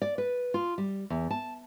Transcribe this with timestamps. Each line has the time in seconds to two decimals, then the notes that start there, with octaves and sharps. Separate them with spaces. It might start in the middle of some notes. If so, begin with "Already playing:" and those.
0.02 D5
0.18 B4
0.54 F4
0.78 G3
1.10 E2
1.30 A5